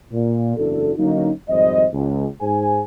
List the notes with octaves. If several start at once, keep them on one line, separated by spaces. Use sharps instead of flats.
A#2
F#1 E2 D4 E4 F#4 A4
D3 F#3 A#3 C#4 D#4
G#1 F2 G3 C5 D#5
C#2
G#2 G#4 C5 G#5